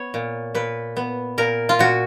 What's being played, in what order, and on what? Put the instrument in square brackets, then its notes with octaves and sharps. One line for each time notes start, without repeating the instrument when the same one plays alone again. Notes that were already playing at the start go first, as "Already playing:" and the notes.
Already playing: [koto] B3 C#5
A#2
A#2 B4
B3
A#2 A#4
F4
A#2 F#4